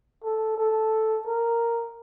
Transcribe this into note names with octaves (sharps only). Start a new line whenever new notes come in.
A4
A4
A#4